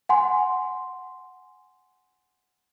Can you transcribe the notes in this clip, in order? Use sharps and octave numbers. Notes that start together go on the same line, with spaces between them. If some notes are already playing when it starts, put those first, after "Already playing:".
F#5 G#5 C6